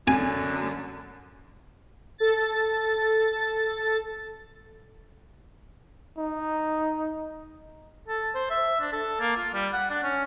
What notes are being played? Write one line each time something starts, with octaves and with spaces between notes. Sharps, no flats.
F#2 D3 G#5
A4 A6
D#4
A4
C5
E5
D4
A4
A#3
F4
G3
F#5
D4
C#4